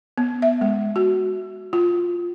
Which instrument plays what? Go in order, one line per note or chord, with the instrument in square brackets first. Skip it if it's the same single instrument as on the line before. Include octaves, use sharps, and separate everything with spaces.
[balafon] B3
E5
G#3
F#4
F4